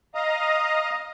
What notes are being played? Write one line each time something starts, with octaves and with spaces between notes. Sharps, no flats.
D#5 F5 A#5 D#6